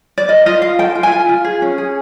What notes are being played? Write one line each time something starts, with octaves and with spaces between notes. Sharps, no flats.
D5
A#4 D#5
F4 D#5
F4 F5
A4 G5
F4
G#5
F4
F4
G#4
C#4
G#4